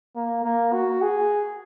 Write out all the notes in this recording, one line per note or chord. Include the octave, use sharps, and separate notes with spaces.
A#3
A#3
F#4
G#4